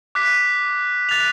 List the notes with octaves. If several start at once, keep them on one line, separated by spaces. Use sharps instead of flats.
D6 F#6 B6
F#6 A6 F7